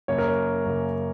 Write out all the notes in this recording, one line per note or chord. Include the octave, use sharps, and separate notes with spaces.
F#2 C#3 A#3 C#5
A#4
C#5
F#2 C#3 A#3